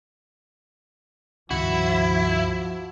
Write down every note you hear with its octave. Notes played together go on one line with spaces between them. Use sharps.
C#2 G2 D#3 F3 E4 F#4